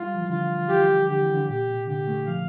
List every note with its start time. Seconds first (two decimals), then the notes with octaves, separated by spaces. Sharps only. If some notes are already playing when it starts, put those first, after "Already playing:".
Already playing: G3 F4
0.15 F3
0.22 E3
0.29 D3 F4
0.69 E3 G4
1.08 D3 G4
1.21 E3
1.34 D3
1.48 A#2 G4
1.68 C3
1.87 D3 G4
2.07 A3
2.26 F3 F5